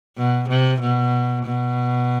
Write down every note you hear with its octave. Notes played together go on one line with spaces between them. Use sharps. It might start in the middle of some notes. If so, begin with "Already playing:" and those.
B2
C3
B2
B2